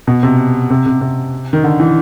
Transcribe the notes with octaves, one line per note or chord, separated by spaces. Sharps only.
B2
C3
C3
C3
C3
D#3
D3
E3